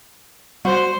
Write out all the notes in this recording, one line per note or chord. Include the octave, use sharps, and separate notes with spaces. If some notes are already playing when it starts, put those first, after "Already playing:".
G3 F#4 C5